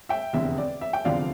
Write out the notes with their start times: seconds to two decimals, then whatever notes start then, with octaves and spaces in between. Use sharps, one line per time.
0.09 E5 G5
0.33 F1 E2 D3 E5
0.58 D5
0.81 E5
0.93 G5
1.05 F1 E2 D3 F3 D5 F5